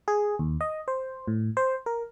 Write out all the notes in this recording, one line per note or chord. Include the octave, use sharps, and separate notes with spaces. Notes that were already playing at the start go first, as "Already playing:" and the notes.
G#4
D#2
D#5
C5
A2
C5
A#4